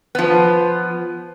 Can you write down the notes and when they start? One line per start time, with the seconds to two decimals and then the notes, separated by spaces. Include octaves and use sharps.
0.15 F3 B3